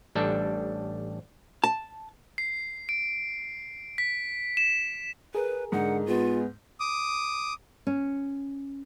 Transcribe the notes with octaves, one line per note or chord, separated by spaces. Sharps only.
A1 G3 D4 A4
A5
C7
D7
B6
E7
G#4 A#4 B4
G#2 D3 D#4 F#5
G#3 B3 F4
D6 D#6
C#4